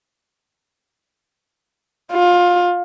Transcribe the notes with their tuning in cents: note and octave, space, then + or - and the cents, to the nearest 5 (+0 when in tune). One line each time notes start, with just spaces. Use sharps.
F4 +20